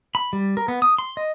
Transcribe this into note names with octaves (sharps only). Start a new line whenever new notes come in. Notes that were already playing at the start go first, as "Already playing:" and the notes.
B5
G3
A#4
B3
D#6
C6
D#5